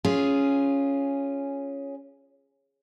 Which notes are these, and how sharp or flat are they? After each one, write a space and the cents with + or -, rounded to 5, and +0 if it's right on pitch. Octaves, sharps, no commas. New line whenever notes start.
C#4 +0 F4 -5 G#4 +0